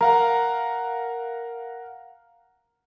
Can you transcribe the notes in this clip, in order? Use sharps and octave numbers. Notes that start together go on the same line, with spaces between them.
A#4 F5 F#5 A#5